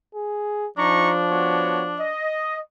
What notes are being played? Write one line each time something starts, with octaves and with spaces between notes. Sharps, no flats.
G#4
F3 D4 D#4 A#5 C#6
B3 F#4 C#5
D#5